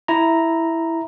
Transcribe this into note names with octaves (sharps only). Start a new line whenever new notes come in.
E4 A#5